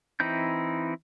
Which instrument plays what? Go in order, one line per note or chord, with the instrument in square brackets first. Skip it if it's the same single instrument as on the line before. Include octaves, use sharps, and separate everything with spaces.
[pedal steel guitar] E3 C4 D#4 E4 G6